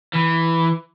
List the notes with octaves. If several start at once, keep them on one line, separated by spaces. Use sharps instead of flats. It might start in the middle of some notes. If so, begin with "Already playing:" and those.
E3